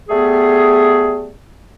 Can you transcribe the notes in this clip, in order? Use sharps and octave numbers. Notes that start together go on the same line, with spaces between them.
G3 A3 B3 G#4